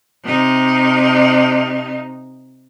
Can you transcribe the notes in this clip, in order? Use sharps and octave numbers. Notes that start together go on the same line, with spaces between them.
C3 D#4